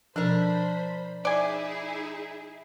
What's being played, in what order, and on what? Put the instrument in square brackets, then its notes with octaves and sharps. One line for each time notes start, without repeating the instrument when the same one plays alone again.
[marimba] B2 F3 [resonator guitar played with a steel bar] D4 A#4 [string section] C5 B5
[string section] D#4 E4 G#4 [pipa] D5 G#5